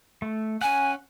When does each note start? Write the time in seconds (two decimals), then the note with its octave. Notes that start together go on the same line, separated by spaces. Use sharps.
0.22 A3
0.61 C#4 F#5 G#5